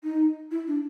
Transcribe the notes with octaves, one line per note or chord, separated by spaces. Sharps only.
D#4
E4
D4